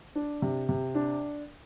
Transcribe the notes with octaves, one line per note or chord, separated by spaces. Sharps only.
D4
C3
C3
D4